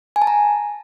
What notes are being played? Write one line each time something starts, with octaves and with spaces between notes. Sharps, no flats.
G#5
A5
A#5